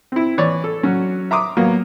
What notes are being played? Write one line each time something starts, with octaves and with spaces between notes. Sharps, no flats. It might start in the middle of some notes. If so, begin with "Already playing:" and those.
C4 E4
E3 C#5 D5
A4
F#3 C#4 F#4
E5 A#5 C6 D6 D#6
F#3 A#3 B3